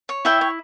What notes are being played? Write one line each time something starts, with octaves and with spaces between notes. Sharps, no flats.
C#5
E4 E5 G5
C#5